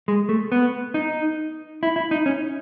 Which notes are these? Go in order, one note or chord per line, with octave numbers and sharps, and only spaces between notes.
G#3
A3
B3
D#4
E4
E4
D#4
C#4